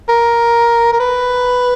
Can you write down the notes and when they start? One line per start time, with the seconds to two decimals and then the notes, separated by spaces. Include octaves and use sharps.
0.09 A#4
0.93 A#4
1.00 B4